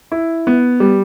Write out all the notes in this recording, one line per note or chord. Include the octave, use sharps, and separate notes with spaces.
E4
B3
G3